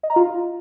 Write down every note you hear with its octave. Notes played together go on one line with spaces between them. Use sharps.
D#5
A#5
F4